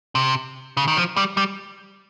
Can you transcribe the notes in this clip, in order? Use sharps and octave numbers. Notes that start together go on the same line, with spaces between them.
C3
C#3
D#3
F3
G3
G3